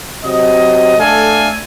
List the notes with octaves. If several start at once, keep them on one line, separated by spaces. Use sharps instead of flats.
C3 F#3 D#5
A3 D4 A4 F5 G#5